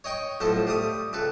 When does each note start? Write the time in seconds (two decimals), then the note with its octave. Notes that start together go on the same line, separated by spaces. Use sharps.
0.04 C#5 D#5 G5 C#6
0.40 B1 A2 F3 A4 C5
0.67 G3 A3 D#6
1.13 C#2 A4 B4